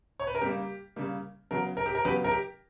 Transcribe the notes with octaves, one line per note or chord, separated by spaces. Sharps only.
C#5
B4
A#4
C#3 G3 A#3 G4
C#3 G3 A#3
C#3 F#3 B3 A#4
A#4
G4
A#4
C#3 F#3 B3 G4 B4
A#4
G4